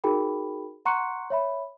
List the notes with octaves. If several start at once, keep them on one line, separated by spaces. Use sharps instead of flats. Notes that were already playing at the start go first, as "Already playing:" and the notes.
D#4 F#4 G#4 A#4 G5 B5
F#5 A#5 C6 C#6 F#6 C#7
C#5 E5 B5